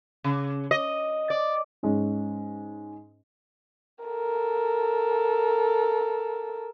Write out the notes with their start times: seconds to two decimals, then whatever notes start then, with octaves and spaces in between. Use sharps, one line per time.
0.24 C#3
0.71 D#5
1.30 D5
1.83 G#2 G#3 C#4
4.04 A4 A#4